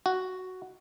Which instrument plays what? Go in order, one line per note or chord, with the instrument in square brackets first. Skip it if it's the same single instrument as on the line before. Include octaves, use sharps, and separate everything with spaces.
[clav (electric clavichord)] F#4